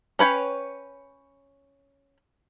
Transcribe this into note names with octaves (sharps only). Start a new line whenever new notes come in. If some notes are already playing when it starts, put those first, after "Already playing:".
C#4 B4 C#5 G5